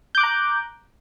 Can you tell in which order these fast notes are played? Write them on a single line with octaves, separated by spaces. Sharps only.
G6 D6 F#6 A#5